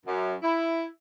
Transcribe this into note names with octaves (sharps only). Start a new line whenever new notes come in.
F#2
E4